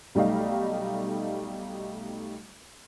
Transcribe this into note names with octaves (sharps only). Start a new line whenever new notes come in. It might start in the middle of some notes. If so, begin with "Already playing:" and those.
B1 G3 A3 D#4 F5